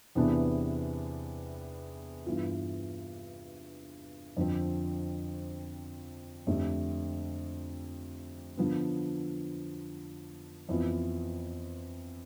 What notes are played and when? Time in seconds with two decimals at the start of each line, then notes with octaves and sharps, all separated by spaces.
0.15 E2 C3 E3 B3 D4
2.26 G2 E3 B3 F4
4.37 F2 D3 F3 C4
6.47 F2 D3 A3 D4 G4
8.57 D3 F3 B3
10.69 F2 E3 B3 F4